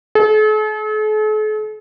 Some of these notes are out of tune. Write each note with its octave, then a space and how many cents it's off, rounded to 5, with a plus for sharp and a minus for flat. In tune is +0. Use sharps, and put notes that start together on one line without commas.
A4 -45